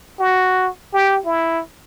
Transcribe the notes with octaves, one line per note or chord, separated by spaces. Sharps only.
F#4
G4
E4